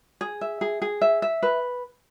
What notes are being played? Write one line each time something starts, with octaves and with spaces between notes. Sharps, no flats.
G#4
E5
G#4
G#4
E5
E5
B4